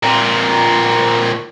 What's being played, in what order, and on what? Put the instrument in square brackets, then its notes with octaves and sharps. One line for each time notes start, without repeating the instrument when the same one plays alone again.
[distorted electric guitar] A#2 C4